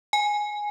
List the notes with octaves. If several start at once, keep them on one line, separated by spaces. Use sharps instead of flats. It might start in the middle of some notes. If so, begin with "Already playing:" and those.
G#5